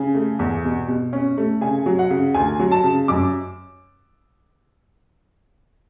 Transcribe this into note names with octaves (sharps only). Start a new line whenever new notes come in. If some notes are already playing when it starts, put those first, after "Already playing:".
Already playing: C#3 G#5
A3
E2
B2
B2
C#4
A3
C#3 G#5
F#3
F#5
C#3
D2 G#5
F#3
A5
C#3
F#2 D6